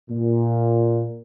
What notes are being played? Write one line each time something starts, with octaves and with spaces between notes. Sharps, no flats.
A#2